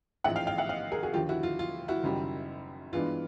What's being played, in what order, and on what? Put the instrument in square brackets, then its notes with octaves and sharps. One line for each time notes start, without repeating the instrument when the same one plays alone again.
[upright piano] A1 G#2 F3 G#3 E5 F#5
F5 G5
F5 G5
E5 F#5
D#5 F5
G#4 A#4
F#4 G#4
D#2 D3 F3 F4 G4
E4 F#4
F4
F4
E4 F#4
F#1 F#2 D#3 G3
G2 E3 G#3 B3 D4 F4